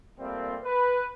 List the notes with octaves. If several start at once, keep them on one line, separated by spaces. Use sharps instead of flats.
A#2 G3 A3 C4
B4